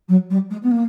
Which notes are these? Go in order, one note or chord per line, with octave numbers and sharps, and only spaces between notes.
F#3
G3
G#3
B3
A#3